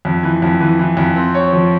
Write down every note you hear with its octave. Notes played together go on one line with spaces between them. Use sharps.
F2
E3
F2
E3
E3
F2
C4
C#5
F3